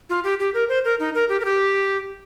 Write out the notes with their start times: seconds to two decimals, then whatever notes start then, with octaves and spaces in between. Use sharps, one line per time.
0.10 F4
0.24 G4
0.40 G4
0.54 A#4
0.69 C5
0.85 A#4
0.99 D#4
1.15 A#4
1.29 G4
1.40 A#4
1.45 G4